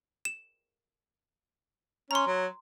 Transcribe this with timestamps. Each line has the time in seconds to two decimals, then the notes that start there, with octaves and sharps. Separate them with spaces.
0.25 E7
2.11 C#4 A#5 C6
2.27 F#3